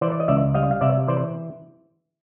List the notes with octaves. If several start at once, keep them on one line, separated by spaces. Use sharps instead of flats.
E3 C5 D5
D5
D#5
C#2 D5 E5
G3 D#5 F5
F5
C3 D5 E5
E3 C5 D5